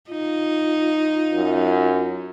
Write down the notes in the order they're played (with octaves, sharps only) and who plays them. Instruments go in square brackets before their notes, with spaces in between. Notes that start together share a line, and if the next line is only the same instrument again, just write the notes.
[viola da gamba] D#4 [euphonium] F4
[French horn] F#2